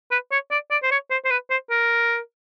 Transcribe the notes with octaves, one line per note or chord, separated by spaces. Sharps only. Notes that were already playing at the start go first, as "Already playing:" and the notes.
B4
C#5
D5
D5
C5
C#5
C5
C5
B4
C5
A#4